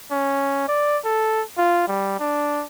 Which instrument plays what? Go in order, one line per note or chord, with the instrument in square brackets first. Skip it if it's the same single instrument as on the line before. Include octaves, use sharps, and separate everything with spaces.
[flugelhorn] C#4
D5
A4
F4
G3
D4